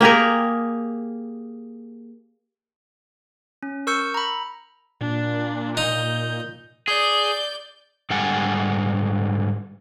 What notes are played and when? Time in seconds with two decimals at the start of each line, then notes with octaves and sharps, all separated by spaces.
0.01 A#3 G4 G#4 A#4
3.63 C#4
3.87 A#4 C#6 E6 G6 C#7
4.14 A#5 B5
5.01 A#2 D4
5.77 D#4 G6
6.88 G#4 D5 G6
8.10 G#2 D3 G3 F#5 G#5